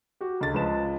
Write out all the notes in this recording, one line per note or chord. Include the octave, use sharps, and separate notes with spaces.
F#4 G4
C#2 D3 A6
C#2 F3 G#3 B4 E7